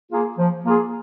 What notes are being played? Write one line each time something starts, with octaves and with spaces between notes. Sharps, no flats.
A#3 F4 G#4
F3
A#3 F4 G#4